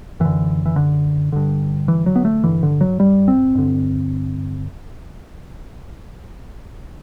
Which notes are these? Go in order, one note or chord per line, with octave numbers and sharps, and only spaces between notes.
F#2 D3 E3
E3
D3
G2 D3
E3
F#3
B3
A3
G2 D3 E3
D3
F#3
G3
C4
G2 D3